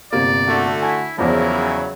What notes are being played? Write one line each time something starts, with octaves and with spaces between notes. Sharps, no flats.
G1 C3 A#3 D5
D3 A3 F#4
E4 G#5
E2 C#3 F3 F#3 E4 A#4